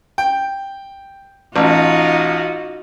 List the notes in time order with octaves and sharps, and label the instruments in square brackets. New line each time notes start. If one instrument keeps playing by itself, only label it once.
[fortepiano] G5
[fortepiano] A1 [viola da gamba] D#4 F4 F#4